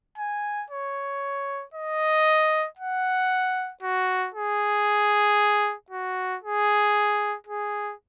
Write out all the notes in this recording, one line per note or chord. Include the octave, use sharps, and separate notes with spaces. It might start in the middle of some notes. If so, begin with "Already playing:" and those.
G#5
C#5
D#5
F#5
F#4
G#4
F#4
G#4
G#4